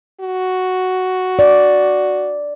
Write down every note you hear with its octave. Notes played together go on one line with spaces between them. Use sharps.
F#4
D5